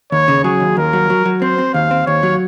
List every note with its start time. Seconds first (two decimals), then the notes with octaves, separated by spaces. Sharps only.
0.11 D#2 C#5
0.28 C#3
0.44 F#3 G#4
0.60 D#2
0.77 D#2 A#4
0.93 F#3
1.10 F#3
1.25 F#3
1.42 C4 C5
1.58 C4
1.74 D#2 F5
1.91 C4
2.06 D#2 C#5
2.23 F#3